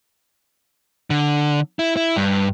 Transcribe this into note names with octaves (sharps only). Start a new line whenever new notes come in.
D3
E4
E4
G2